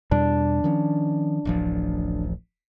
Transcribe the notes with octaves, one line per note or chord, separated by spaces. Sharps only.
E2 B2 G3 D4
D#3 F3 C#4
D1 A1 F3